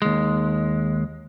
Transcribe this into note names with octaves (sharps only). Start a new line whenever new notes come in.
D#2 G#3